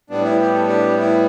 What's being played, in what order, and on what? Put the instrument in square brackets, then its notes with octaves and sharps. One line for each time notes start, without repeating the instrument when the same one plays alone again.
[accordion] A2 G3 B3 D4
E4
G4
A4
D4 G4
E4